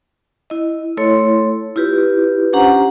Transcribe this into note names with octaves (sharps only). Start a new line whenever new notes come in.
E4 D#5
A3 E4 A4 C#5 C6
E4 F4 G4 B4
C#4 D4 G4 C5 F#5 A#5